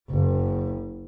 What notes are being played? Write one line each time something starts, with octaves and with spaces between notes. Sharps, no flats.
F#1